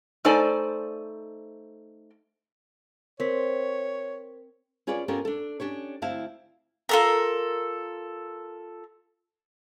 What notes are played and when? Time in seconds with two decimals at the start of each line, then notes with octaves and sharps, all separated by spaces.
0.25 A3 D#4 A4 C5 D5 G#5
3.20 C4 A#4 C5 C#5 B6
4.87 C#4 F4 G#4 B4 C#5 D5
5.08 B3 C#4 F4 G4 A4 A#4
5.25 D4 A4
5.60 C#4 D4 G4 C#5
6.02 D2 C4 E4 F5 A5
6.89 F4 A4 A#4